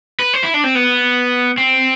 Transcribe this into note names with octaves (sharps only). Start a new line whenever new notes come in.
B4
C5
E4
D4
C4
B3
C4